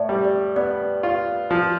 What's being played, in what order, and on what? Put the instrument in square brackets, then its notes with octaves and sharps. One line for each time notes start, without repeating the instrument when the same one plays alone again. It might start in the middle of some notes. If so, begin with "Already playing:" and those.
Already playing: [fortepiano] A2 [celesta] D5 E5
[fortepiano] G3
[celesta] D5
[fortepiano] B3 [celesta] D5
[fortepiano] F4
F3